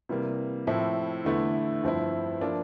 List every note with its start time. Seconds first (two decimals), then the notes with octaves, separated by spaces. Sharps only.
0.09 C3 E3 G3 A#3
0.67 A2 F3 C4 E4
1.25 E2 D3 A3 E4
1.83 G2 F3 C4 E4
2.41 F3 A#3 D4